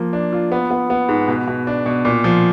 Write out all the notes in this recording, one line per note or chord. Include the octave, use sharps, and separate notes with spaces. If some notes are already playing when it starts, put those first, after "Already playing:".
Already playing: F3 A#3
D4
F4
B3
B3
B3
G#2
B2
B2
D4
B2
A#2
F3